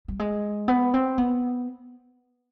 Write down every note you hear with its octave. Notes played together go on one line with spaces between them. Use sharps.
G3
G#3
B3
C4
B3